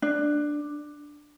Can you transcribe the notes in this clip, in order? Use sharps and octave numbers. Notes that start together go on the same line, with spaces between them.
D4